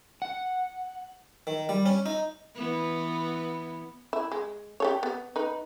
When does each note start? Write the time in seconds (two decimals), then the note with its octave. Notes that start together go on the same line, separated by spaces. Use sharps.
0.22 F#5
1.47 D#3
1.69 G3
1.86 C#4
2.06 D#4
2.55 E3 B3
4.13 E4
4.32 G#3
4.80 G4 A4 C#5
5.03 B3
5.36 D#4 B4